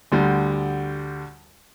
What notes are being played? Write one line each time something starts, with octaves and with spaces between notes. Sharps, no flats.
D2 D3 G3